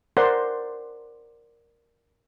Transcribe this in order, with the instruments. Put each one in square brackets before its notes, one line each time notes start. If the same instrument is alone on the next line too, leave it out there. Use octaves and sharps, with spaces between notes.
[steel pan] A#4 C5 D5 F#5 C6